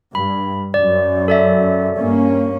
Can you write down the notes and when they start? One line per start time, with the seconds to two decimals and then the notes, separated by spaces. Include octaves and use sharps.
0.15 G2 B5
0.74 F#2 D5
1.28 A4 D5 E5
1.97 G2 A#3 C#4